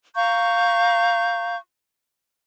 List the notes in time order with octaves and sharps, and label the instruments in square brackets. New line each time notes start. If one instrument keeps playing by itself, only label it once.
[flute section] F5 A#5 C#6 G6